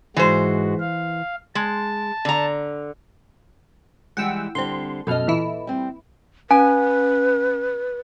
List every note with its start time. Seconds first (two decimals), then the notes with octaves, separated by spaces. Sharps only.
0.16 G#2 E3 G#3 F#4 C5
0.80 F5
1.55 G#3 A5
2.25 D3 A#5
4.17 E3 G3 G#3 F#5 G5 E6
4.55 D3 G3 C4 C6
5.07 F#2 B2 A4 D#5 F6
5.27 A#2 E3 E4
5.67 G3 C4
6.51 C#4 B4 G#5